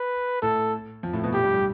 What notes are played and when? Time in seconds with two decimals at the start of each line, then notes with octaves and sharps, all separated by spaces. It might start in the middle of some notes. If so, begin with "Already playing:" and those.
Already playing: B4
0.42 A2 A3 A4
1.03 F2 F3
1.13 A2 A3
1.23 B2 B3
1.34 A2 A3 G4
1.44 G2 G3
1.54 G3